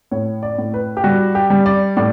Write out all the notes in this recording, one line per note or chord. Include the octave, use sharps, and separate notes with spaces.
A2 C#5
D5
A2
B4
G4
G3 F#4
G4
G3
D5
A2 D5